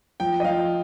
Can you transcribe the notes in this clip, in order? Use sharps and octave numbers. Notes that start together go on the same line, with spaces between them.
F3 G5
D#5
F3 F5